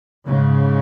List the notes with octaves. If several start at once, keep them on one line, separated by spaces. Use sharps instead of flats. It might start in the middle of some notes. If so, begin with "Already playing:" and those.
G#2 C#3